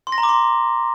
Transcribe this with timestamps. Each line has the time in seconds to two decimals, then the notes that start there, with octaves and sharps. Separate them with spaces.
0.07 C6
0.12 A#6
0.18 A#5
0.23 D6
0.29 C6